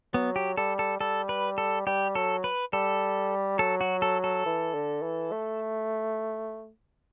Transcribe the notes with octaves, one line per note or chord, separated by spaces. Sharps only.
F#3 B3
G4
G3 A4
A4
G3 A4
B4
A4
G3 G4
F#3 A4
B4
G3 A4
F#3 A4
F#4
A4
A4
E3
D3
E3
A3